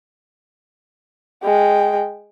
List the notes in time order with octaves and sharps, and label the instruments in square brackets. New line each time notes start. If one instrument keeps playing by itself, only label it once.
[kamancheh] G#3 G5